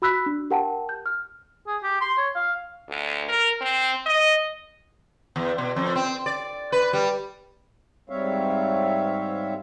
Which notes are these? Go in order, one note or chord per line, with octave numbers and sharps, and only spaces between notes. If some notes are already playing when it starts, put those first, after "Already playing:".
F#4 B5 E6 F#6 B6
D4
G4 A#4 F#5 G5 A5
G6
F6
G#4
G4
C6
C#5
F5
D2
A#4
C4
D#5
E2
B2
F2
C4
D5
B4
G3
G#2 G3 C4 C#5 E5 F5